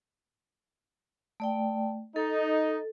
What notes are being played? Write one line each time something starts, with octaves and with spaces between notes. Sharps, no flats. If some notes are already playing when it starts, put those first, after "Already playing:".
A3 D5 G5
D#4 A4